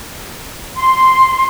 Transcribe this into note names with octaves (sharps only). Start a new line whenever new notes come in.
C6